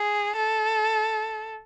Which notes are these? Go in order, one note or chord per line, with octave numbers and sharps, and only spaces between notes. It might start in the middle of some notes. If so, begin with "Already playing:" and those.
Already playing: G#4
A4